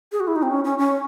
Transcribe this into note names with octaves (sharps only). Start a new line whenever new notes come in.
G#4
F#4
E4
D#4
C4
C#4
C#4
C#4